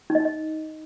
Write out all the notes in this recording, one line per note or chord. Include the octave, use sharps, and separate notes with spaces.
D#4
D#5
D#4
D#5